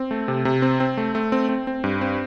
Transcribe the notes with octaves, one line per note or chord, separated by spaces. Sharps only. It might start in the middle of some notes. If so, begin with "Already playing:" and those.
Already playing: C4
A3
C3
C3
C4
C4
A3
A3
C4
C4
C4
G2
C4